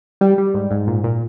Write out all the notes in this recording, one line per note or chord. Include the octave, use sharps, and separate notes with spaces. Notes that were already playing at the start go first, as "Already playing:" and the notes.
G3
G3
G#2
G#2
A#2
A#2